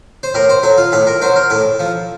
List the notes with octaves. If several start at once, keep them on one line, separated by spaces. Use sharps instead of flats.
C5
A2 A#4
C5
F#3 A4
F4
A2 A4
A#4
F#3 C5
A#4
A2 A4
F3